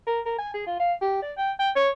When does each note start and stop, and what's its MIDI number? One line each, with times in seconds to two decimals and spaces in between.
0.07 0.20 70
0.26 0.37 70
0.38 0.52 80
0.54 0.62 68
0.67 0.79 65
0.80 0.93 77
1.01 1.17 67
1.22 1.32 74
1.38 1.51 79
1.59 1.70 79
1.76 1.89 73